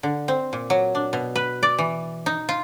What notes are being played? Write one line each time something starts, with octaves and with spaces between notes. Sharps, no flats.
D3
C4
A#2
F#3
D4
B2
B4
D5
E3
D#4
F4